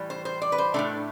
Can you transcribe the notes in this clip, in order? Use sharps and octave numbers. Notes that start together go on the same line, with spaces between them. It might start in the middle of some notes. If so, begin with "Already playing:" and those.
Already playing: A2 E3 G3
C5
C5
D5
B4
C5
A2 E3 A3 D4